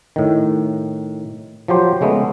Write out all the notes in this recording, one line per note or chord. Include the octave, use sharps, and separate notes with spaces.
A2 D#3
F3 F#3 G4 C5
C#3 G#3 A3 B3